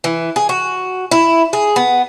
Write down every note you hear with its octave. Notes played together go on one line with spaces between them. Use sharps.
E3
G#4
F#4
E4
G#4
B3